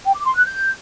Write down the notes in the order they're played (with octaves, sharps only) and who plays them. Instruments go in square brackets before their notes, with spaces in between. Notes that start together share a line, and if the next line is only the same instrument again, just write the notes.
[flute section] G5
D6
C6
F#6
G6